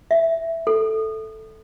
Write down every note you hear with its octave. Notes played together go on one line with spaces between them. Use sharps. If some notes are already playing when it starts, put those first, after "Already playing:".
E5
A4